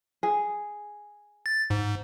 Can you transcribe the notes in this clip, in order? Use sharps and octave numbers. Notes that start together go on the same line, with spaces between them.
G#4
A6
G#2